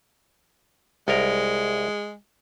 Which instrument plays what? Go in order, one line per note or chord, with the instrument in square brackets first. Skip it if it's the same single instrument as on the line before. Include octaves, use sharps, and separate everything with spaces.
[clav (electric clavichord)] C2 A#4 [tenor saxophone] G#3